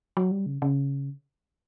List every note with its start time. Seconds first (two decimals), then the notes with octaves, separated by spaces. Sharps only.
0.17 F#3
0.31 G3
0.46 C#3
0.62 C#3